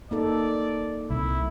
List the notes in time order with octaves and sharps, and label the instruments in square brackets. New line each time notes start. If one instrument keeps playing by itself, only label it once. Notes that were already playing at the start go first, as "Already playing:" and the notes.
[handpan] A#3 D#4 A4 [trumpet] D5
[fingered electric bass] C2 [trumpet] E4